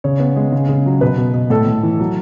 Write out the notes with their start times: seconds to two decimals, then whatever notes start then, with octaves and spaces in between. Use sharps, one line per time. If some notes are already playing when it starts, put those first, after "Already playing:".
0.04 C#3 C#5
0.20 B3
0.36 G#3
0.52 C#3
0.69 C#3
0.86 F#3
1.01 B2 B4
1.18 B2
1.34 B2
1.50 A2 A4
1.67 A2
1.83 E3
1.99 F#3